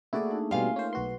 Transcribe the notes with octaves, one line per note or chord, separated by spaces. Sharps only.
A3 A#3 E4 F#4 G#4 D5
D4 D#4 A5
B2 G3 C4 D#4 F4 F5 G#5
C#4 D#4 A#4 C5
B1 F#4 B4 C6